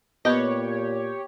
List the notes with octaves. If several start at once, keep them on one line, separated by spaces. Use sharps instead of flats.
A#2 B3 G4 B4 C#5 D#5 G6